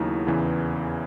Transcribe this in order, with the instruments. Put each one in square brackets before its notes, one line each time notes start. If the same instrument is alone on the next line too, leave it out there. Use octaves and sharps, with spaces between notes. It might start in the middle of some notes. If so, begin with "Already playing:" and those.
Already playing: [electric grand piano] D#2 C#3 F#3 B3 D#4 [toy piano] E4
[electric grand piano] E2 C#3 E3